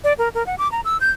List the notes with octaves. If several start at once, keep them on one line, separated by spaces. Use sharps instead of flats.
D5
A#4
A#4
F#5
D6
A#5
E6
G6